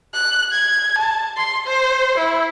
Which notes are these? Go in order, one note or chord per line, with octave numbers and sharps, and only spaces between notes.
F#6
G#6
A5
C6
C5
E4